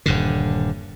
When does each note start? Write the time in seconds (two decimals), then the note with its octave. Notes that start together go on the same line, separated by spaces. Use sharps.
0.06 D#1 G2 D3